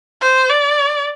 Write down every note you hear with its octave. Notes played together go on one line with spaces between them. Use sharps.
C5
D5